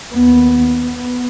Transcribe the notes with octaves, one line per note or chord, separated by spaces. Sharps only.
D#2 B3
B3